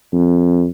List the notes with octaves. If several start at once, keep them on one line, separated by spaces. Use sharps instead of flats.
F2